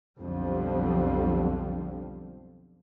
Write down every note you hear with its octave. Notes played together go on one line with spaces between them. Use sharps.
B1 F2 D3 F3 G3